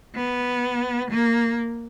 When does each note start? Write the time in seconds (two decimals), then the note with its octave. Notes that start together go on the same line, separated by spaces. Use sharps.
0.15 B3
1.11 A#3